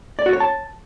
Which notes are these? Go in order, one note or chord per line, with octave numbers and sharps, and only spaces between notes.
D5
F#4
C#5
A5